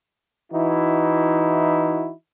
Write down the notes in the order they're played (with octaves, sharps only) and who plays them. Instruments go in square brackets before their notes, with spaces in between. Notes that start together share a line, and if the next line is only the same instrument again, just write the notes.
[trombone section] E3 D#4 E4 F#4